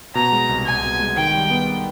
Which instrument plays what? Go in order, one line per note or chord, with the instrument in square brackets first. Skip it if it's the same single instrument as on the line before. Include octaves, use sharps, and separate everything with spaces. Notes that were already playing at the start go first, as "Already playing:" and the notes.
[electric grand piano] B2 [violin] A#5
[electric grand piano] G#3
C2
[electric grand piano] C2 [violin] G#5
[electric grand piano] B2
G#3
[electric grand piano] D#3 [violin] G5
[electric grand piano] G3
B3